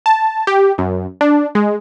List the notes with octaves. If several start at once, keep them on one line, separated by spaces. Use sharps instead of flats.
A5
G4
F#2
D4
G#3